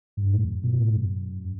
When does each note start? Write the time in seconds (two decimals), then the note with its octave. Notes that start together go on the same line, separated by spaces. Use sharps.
0.17 G2
0.33 A2
0.44 E2
0.48 F#2
0.64 B2
0.80 A2
0.95 F#2